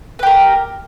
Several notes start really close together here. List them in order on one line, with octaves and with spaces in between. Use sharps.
B4 G4 A#4